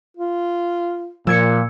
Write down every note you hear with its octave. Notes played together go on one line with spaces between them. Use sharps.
F4
A#2 F3 E6 G#6 C#7